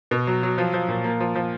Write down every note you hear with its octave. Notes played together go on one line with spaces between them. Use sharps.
B2
F#3
F#3
F3
F3
A#2
A#3
F3
F3